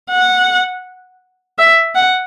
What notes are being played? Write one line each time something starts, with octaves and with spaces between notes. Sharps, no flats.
F#5
E5
F#5